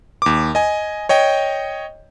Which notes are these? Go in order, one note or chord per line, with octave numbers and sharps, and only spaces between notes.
D#2 D6
D#5 G#5
C#5 D#5 G5